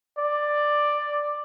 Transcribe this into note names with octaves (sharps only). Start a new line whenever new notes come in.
D5